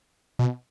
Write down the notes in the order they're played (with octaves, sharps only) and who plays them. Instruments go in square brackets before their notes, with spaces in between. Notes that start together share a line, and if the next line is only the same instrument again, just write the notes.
[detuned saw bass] B2